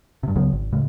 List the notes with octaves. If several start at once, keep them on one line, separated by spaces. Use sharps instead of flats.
G2 C3
C#2 C#3 F#3 B3
G#1
D2 A2 C#3 G#3